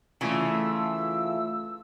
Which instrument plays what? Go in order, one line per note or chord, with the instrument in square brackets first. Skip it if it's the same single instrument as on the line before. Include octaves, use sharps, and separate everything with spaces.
[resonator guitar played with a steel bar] C#3 E3 [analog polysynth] A3 F4 [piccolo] E6